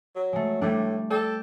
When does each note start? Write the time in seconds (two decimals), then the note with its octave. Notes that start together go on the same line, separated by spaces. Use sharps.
0.16 F#3
0.33 G#3 A3
0.61 A2 G3 A3 D4
1.10 A4 D5 G5